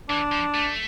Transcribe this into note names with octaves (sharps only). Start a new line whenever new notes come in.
E3 D4
F3
A3